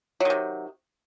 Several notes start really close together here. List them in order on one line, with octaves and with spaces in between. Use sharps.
F#3 D#3 C3